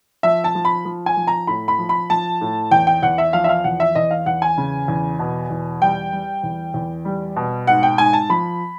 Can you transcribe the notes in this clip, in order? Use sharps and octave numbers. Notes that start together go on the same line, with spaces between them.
F3 E5
A5
F3
B5
F3
G#5
F3
A#5
A2 B5
B5
F3
B5
F3 A5
A2
E2 G5
G5
E2 F#5
E5
F3 F5
E5
F5
E2 F#5
E5
E2 D#5
F5
E2 F#5
G#5
C#3
E2
B2
E2
G3 G5
G3
E2
E2
G3
B2
G#2 F#5
G5
G#2 G#5
A5
F3 B5